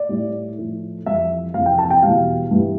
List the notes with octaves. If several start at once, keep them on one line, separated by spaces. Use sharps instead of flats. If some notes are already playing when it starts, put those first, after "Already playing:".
Already playing: D5
A2 G3
A2 F3 A3
F2 E3 G3 E5
F2 C3 E3 F5
G5
A5
G5
E2 B2 G3 F5
G2 E3 G3